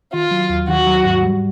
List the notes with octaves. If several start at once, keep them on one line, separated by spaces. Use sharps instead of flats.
D#3 F4
F#3
D#2
D#3 F#4
F#3
G#2
G3